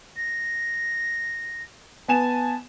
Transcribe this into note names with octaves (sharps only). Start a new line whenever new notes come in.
A#6
B3 G#5 A5 E7